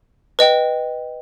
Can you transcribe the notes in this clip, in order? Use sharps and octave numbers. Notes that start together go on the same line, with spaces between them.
B4 D#5 G5